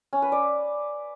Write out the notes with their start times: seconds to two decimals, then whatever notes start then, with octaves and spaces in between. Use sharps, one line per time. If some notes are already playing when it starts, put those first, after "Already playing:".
0.13 C#4
0.22 B4
0.32 D5